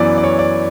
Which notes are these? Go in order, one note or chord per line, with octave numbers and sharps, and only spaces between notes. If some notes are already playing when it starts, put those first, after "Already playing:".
Already playing: F#2 E3 B3 D5
D5
C#5
D5